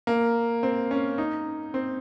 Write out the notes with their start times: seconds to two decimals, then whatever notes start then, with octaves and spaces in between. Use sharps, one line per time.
0.07 A#3
0.63 C4
0.91 C#4
1.18 D#4
1.74 C4